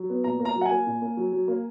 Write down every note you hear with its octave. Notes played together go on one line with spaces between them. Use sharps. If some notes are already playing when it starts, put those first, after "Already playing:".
Already playing: F#3
B3
A#2 A#5
A#3
A#5
F#3
F#5
G#5
A#3
A#2
A#3
F#3
F#3
A#3